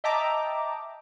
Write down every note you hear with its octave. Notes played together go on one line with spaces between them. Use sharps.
D#5 E5 G5 A5 A#5 D6